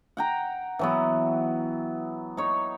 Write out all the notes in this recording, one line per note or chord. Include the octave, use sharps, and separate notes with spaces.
F#5 G5 A#5
E3 F#3 B3
D#4 C#5